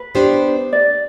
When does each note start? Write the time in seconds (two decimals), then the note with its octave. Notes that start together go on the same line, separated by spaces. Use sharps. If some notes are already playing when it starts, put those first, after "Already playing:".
Already playing: B4
0.15 B3 D4 G4 C5
0.73 D5